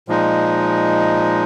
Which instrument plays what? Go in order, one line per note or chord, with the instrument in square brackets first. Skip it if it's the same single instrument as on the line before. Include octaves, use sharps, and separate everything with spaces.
[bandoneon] A#2 F3 G#3 D#4